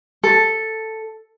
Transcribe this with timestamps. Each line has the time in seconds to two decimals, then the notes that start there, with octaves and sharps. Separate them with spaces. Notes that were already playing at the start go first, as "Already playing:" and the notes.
0.23 A4